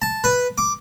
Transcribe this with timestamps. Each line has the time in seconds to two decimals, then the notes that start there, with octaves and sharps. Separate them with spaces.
0.02 A5
0.24 B4
0.58 D6